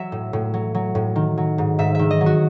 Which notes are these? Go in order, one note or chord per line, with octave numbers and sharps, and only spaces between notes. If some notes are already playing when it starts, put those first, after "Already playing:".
Already playing: F#3 E5
A2
A2
F#3
F#3
A2
D#3
F#3
G#2
G#2 E5
D#3 E5
D#5
F#3
F#4